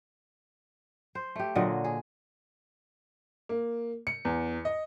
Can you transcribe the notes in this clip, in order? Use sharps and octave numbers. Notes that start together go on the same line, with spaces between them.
C5
A3 G4
A#2 D3 F#3 D#5
G#4
A#3
C#7
E2
D#5